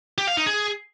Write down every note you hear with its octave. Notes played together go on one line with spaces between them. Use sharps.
G4
F5
D#4
G#4